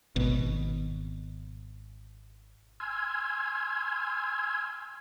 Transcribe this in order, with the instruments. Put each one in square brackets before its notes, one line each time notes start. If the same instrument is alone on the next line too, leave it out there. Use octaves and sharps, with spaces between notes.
[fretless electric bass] G#1 B2
[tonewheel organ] G#5 C6 E6 F6 G#6